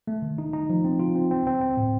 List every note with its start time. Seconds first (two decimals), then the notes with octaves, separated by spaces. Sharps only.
0.07 A3
0.22 D#3
0.38 D#4
0.53 D#4
0.70 F3
0.85 C4
0.99 F4
1.15 C4
1.31 C4
1.47 C4
1.61 C4
1.77 A2